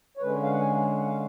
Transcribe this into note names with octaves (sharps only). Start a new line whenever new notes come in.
C#5
D3 G#3 C#4 B4
F5
F#5
G#5
F#5
F5